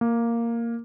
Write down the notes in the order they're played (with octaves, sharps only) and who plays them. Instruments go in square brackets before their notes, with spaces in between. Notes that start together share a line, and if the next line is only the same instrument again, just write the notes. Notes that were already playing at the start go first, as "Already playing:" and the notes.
[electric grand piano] A#3